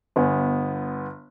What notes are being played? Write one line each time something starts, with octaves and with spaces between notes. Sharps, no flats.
G1 B3 G#5